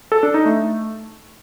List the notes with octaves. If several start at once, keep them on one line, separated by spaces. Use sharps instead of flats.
A4
D4
D#4
A3